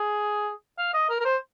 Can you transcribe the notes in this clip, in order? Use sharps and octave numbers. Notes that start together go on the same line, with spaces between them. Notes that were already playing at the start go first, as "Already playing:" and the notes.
Already playing: G#4
F5
D#5
A#4
A#4
C5